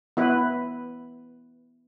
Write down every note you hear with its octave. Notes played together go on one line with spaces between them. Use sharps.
B3 E4 B4